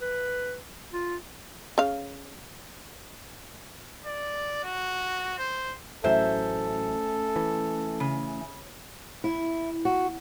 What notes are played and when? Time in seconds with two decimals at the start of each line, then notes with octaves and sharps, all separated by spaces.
0.01 B4
0.93 F4
1.78 C#3 F5
4.06 D5
4.64 F#4
5.39 C5
6.04 A1 A2 F#3 A3 C#4 A4 C5 E5
7.36 E3
8.00 C#3
9.24 E4
9.85 F#4